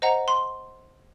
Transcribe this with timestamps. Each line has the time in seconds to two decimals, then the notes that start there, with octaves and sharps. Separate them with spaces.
0.02 C5 D#5 F#5 A#5
0.28 C6